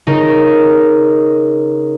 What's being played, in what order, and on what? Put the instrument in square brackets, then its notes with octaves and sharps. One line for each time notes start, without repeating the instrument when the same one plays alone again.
[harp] C#3 D#4 A#4